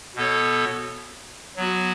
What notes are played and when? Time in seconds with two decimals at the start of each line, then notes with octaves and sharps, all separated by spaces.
0.15 B2 B3 A4 C#5
1.56 F#3 B3 F#4